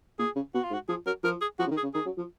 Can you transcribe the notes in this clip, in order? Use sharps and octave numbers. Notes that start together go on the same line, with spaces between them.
A#2 G#4
C#3
B2 F#4
F4
G#2
F#4
F3 G#4
F#3 A#4
F3 A#4
G#4
F3 F#4
C#3
D#3
G#4
C#3
D#3 G#4
F#3
F3